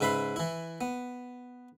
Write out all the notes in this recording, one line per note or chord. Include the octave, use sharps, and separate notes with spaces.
G#2 C#3 B4 E5 B5 C6
E3 E4
B3